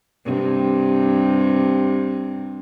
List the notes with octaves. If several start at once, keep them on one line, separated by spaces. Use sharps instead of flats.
G2 C3